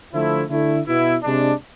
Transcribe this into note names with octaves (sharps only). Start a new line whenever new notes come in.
D3 F3 A3 E4
D3 A3 E4
B2 B3 E4
C3 G#3 D4